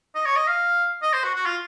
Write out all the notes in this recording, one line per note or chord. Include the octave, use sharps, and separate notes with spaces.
D#5
C#5
D#5
F5
D#5
C5
F#4
F#4
F4